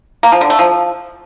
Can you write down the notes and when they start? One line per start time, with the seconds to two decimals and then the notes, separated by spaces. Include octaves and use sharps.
0.23 A#3
0.32 F3
0.41 D3
0.50 A3
0.59 F3